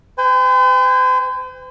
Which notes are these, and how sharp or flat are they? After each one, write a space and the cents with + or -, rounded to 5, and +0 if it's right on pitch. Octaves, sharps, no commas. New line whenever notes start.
C5 -45 G5 +40